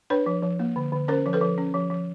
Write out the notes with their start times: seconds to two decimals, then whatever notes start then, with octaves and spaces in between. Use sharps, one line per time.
0.10 D4 B4 C#5
0.26 F3
0.43 F3
0.59 A#3
0.76 D3
0.92 D3
1.08 C#4 A#4 C5
1.26 F3
1.33 A4 B4
1.41 F3
1.58 C#4
1.74 F3
1.90 F3